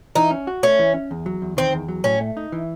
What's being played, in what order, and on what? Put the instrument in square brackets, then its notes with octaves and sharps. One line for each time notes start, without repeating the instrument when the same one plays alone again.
[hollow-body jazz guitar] E3 [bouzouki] D#4
[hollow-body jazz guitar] C#4
F#4
[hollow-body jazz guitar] A3 [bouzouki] C#4
[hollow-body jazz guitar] E3
C#4
E2
F#3
E2
[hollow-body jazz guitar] D#3 [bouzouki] C4
[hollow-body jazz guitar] E2
F#3
[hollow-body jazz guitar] A2 [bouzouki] C#4
[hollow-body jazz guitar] A3
D#4
E3